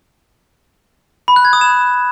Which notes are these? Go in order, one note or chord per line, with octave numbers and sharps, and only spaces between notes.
B5
F#6
G#6
D#6
E7